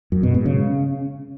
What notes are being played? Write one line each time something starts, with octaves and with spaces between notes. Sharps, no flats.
F#2
B2
G#2
C#3